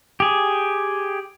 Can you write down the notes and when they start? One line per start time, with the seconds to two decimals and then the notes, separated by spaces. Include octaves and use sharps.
0.20 G4 G#4